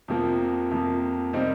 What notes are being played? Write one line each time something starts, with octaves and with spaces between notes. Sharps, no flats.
F2 C3 F3 A#3
F2 C3 F3 A#3
C3 G3 A#3 C4 D#4